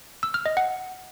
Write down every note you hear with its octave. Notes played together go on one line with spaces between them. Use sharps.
E6
F6
D#5
F#5